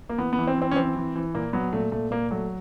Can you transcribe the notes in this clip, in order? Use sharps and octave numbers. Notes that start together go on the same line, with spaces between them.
A#3
E3 B3
B3
E3
C4
E3 C4
C#4
E3 C4
E3
E3
A#2 A#3
F#3 B3
A#2 A3
A#2 A3
A#2 A#3
F#3 A3